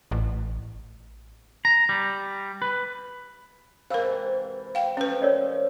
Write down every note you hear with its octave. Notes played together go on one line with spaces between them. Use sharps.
A1
A#5
G3
B4
G#2 C3 E3 A#4 C5 F5 E6
F5 G5
F3 A3 C#4 B4 C5
A#4 C#5 D5